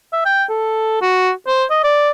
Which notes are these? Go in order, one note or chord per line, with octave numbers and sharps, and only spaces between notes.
E5
G5
A4
F#4
C5
D#5
D5